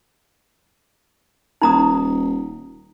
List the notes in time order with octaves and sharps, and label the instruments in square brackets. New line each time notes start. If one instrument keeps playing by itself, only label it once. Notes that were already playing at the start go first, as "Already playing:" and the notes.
[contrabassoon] D#1 [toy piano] D#4 A#5 D#6